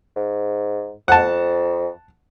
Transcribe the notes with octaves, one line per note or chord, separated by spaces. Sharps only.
G#2
F2 F#5 A5